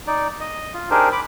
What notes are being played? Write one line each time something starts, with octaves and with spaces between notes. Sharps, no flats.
D#4 D5
D#5
F4
D4 D#4 G4 G#4 A#4 C5
B5 D6